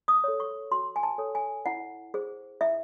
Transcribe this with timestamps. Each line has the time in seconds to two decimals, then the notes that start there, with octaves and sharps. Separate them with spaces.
0.08 D#6
0.24 A4 C#5
0.40 C#6
0.71 F#4 C6
0.96 G#5
1.03 A5
1.18 A4 C#5
1.35 G#5
1.66 E4 F#5
2.14 G#4 C5
2.61 E4 E5